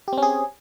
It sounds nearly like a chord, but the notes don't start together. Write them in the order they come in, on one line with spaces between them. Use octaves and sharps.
G4 C4 C#4 G#4